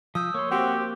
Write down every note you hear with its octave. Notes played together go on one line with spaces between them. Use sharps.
F3 D#6 E6 G6
A#3 C#5 C6
C4 F#4 G4